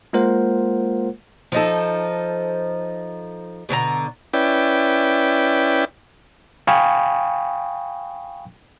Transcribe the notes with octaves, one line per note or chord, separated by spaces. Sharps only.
G#3 A#3 F4 A#4 C5 F#5
F3 D#4 A4
B2 D3 A#4 A#5
C#4 E4 B4 D5 G5
F5 G5 G#5 B5 C#6 D#6